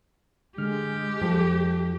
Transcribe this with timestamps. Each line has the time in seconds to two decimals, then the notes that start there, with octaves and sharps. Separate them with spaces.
0.58 D3 G#3 G4 F6
1.21 F2 F3 A3